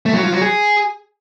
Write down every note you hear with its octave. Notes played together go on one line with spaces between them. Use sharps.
A3
F#3
F4
F#3
G#4